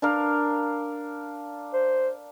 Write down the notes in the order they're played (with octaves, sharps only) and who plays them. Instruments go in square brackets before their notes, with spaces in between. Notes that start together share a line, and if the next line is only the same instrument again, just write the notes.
[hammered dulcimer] D4 A#4 F5
[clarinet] C5